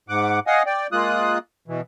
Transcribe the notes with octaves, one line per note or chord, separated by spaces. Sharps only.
G#2 F#5 D6
D#5 F5 F#5 G#5 D#6
D5 G5
G#3 A#3 F4 D#6 F#6
B2 E3